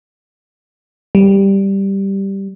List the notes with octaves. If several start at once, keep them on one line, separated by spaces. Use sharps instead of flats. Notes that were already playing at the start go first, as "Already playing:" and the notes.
G3